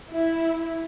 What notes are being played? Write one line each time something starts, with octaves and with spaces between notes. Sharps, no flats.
E4